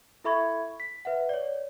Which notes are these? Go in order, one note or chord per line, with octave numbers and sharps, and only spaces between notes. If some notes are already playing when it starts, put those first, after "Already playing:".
E4 A4 E5 B5 C#6 G#6
B6
B4 E5 F#5
C#5 D5